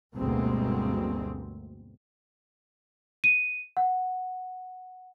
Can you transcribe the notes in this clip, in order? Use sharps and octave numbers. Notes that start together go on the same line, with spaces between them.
G1 D2 B2 G#3 A#3 C4
D#7
F#5